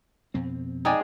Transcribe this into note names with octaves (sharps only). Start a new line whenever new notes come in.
F2 B2 C4
G#3 D#4 G#4 D5 G5 G#5